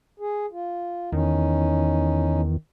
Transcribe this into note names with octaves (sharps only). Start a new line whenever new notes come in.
G#4
F4
E2 D#3 C#4 D#4